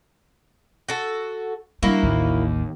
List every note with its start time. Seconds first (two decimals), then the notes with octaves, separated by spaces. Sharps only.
0.89 F#4 A4
1.83 G3 A#3 D4 E4 F#4
2.03 A1 D#2